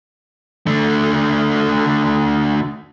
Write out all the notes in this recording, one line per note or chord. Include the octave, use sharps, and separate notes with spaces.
D3 A3